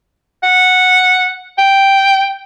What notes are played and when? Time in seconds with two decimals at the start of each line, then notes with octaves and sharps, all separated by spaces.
0.43 F#5
1.58 G5